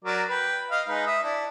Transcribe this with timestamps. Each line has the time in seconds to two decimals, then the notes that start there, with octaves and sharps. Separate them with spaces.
0.05 F#3 A#4 D5
0.29 B4 G5
0.71 D#5 F5
0.88 G#3 D#4 B4
1.07 E5 D#6
1.23 D4 E4